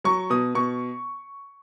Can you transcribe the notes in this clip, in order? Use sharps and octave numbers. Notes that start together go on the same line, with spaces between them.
F#3 C#6
B2 D#6
B2 C#6